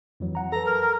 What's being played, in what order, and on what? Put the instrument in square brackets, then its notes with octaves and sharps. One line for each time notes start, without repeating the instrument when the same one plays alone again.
[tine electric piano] F2 E3 F#3
F#5 A#5
[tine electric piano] A4 B4 [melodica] A#5
[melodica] A#4
A#4